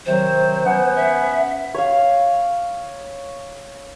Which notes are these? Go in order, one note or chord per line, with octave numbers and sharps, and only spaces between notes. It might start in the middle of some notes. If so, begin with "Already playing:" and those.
C3 D#3 F#3 C5
B3 C#4 F#5
E5
C#5 F5